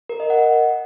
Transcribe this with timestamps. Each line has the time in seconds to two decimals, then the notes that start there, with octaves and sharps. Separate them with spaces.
0.09 A#4
0.20 D#5
0.30 F#5